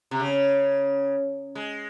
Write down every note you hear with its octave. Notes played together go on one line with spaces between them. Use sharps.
C3
C#3
G#3